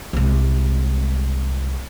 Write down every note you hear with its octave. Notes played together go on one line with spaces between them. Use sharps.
C2 G#3